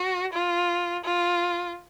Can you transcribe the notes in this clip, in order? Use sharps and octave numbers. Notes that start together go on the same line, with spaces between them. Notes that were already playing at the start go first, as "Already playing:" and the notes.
Already playing: F#4
F4
F4